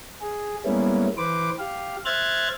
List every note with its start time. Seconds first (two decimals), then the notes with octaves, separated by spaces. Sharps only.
0.21 G#4
0.65 G3 G#3 A#3 B3 C#4 E4
1.17 E3 B4 C5 D6
1.59 G4 F5
2.05 C5 E5 F6 F#6 G#6 A6